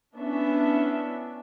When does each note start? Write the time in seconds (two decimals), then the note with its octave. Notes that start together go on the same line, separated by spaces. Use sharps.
0.16 B3 C#4 D4 E4 E5